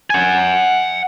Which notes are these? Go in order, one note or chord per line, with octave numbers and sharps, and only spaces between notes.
F#5 G#5